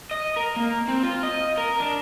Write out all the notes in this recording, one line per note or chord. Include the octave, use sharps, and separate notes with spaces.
D#5
A#4
A#3
C4
F4
D#5
A#4
D4